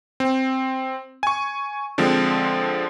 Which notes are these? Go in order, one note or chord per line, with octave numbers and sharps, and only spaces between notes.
C4
G#5 C#6
D3 F3 G#3 C4